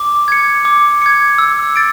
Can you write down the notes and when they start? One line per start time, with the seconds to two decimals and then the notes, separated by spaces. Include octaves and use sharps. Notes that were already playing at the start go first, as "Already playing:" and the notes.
Already playing: D6
0.28 G#6 C#7
0.65 D6
1.02 G#6 C#7
1.38 E6
1.76 A6 D7